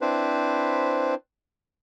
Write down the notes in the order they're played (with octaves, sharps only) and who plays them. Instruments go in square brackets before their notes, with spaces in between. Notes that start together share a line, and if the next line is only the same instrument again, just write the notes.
[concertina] C4 D4 E4 B4 C5